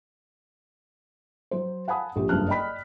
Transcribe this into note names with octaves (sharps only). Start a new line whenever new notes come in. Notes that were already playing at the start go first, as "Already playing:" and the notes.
F#3 C5
F5 F#5 G#5 A5 B5 D#6
A#1 G4
F#1 G2 F#3 A5 F6 F#6
D5 D#5 G5 B5 B6